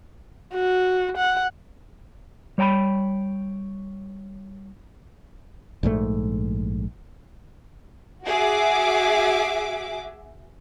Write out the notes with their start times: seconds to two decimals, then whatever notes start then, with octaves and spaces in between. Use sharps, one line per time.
0.54 F#4
1.17 F#5
2.58 G3 C#5 G5 A#5 B5
5.83 A#1 G#2 C3 A3
8.26 F#4 G#4 E5 D6